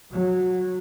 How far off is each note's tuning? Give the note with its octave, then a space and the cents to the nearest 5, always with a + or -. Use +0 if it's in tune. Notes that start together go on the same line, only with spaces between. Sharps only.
F#3 -15